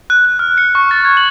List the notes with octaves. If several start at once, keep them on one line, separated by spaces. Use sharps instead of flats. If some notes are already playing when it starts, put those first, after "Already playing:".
F#6
F#6
F6
C#7
C#6
A6
G#6
F#7